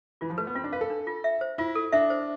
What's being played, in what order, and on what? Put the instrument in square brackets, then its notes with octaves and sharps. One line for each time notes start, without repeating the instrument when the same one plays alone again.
[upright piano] E3 [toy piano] F4
[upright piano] F3
[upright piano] A3 [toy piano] B4
[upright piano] B3
[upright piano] C4 [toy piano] F4
[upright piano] D4
[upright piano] B4 [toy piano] F5
[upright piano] A4
[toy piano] D4
F4
E5
C5
[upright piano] E4 [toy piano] F4
[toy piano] A4
[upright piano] D4 [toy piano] E5
[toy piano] C5